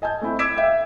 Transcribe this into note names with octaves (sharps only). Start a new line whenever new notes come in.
D#5 G#5 A5 G6
A3 C4 E4
D6 E6 G#6 B6 D7 E7
E5 F5 G5